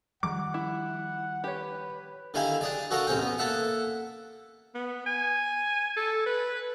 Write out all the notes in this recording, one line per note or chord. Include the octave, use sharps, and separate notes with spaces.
D#3 F3 G3 F#5 D6
E4
G4 B4 C#5
D3 D#3 E4 G4 F5 G#5
D4 G#4 D5
F#4 A4 A#4 D#5 F5
A1 C3 C#4 G5
B3
A#3 A4 E5 F#5
B3
G#5
A4
B4